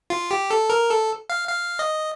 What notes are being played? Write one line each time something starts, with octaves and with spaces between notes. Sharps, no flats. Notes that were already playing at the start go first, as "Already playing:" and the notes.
F4
G4
A4
A#4
A4
F5
F5
D#5